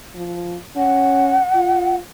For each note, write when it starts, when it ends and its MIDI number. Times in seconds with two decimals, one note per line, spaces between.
0.15 0.56 53
0.77 1.38 61
0.77 1.96 78
1.55 1.98 65